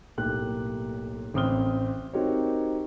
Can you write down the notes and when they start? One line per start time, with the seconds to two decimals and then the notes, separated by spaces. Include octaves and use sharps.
0.18 B1 A2 A#3 G4 F#6
1.34 A1 C4 D#6 F6 G7
2.13 C4 D#4 F#4 G4 A#4 C#5